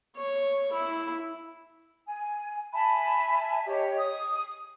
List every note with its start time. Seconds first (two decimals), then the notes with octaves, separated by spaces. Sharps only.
0.17 C#5
0.73 E4
2.07 G#5
2.74 E5 G#5 A5 B5
3.65 G4 C#5 D#5
3.98 D#6